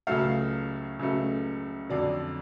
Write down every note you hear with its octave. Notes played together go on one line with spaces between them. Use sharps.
C#2 C#3 F#3 A3 F5
C#2 C#3 F#3 A3
F2 D3 F#3 D5